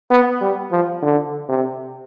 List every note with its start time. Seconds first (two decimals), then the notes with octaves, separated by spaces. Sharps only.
0.11 B3
0.41 G3
0.71 F3
1.02 D3
1.48 C3